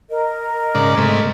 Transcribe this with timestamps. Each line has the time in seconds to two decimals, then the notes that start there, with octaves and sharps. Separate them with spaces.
0.09 A#4 D#5
0.75 G#2 C#3 D5
0.97 G#2 C3 A3